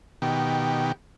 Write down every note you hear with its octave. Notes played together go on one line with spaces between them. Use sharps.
B2 D#3 G4